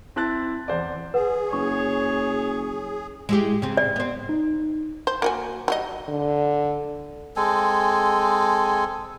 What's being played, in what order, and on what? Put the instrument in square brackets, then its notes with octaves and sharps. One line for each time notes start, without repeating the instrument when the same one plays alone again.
[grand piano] C4 E4 A5 F#6 A6
E2 C5 D5
[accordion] G#4 [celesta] B4 F#5
[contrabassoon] F#1 [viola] C#5 [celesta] C#6
[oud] G#3 E4 G4
C#3 C4
[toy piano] D5
[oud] B3 C4
[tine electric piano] D#4
[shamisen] C5
A#3 F#4 G#5
F#3 G3 D#5
[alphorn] D3
[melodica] G#3 C4 A4 G#5